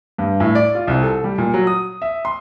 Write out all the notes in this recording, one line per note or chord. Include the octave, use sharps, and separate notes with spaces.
G2
A2
D5
F4
C2
A4
G3
A#2
F#3
D#6
E5
C6